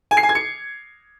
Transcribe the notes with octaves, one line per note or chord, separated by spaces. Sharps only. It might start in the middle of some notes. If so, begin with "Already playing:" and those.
G#5
C7
G#5
G#6
C#7